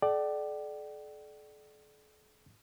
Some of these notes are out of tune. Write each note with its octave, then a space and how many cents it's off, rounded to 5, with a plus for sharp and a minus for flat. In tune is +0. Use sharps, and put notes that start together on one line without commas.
A4 -45 D5 +15 G5 -45